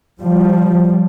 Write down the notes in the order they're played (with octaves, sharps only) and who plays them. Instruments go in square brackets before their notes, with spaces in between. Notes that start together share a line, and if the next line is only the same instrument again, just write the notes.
[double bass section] F3 G3